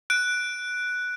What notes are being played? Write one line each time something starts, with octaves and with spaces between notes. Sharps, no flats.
F#6 D7